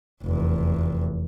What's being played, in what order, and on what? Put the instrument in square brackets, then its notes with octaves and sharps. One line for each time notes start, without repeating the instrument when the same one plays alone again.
[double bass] F1 E2